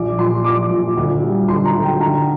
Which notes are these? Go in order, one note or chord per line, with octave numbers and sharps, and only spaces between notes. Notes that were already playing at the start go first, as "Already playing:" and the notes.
Already playing: A#1 D6
A#2 C6
F3 D6
A#2
D2
G3
D2 C6
A#5
D2
G5
D3 A#5